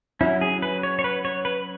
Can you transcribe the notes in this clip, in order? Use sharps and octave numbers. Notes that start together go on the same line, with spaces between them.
F#3 C#4 E4
G#4
B4
C#5
C#5
B4
C#5
B4